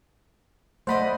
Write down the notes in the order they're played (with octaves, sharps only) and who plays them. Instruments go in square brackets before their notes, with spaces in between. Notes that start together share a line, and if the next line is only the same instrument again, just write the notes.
[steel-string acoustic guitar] A3 D5 D#5 [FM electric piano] C5 F#5 B5